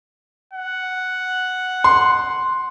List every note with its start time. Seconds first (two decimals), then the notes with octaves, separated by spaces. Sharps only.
0.54 F#5
1.84 C6